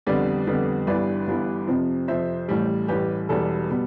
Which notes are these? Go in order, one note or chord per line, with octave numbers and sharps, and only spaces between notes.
F2 D3 G3 B3 B4 D5
F2 D3 G3 B3
G1 G2 E3 B3 B4 D5
G1 G2 E3 B3
F2 C3 F3
F2 C3 F3 C5 E5
A1 A2 G3
A1 A2 G3 G4 B4
E1 E2 B2 G3 B3 A4
B2 G3 B3